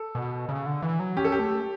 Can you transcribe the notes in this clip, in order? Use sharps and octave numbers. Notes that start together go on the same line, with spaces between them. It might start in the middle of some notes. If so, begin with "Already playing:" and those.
Already playing: A4
B2
C#3
D3
E3
F#3
C#4 G4
A4
G4
A3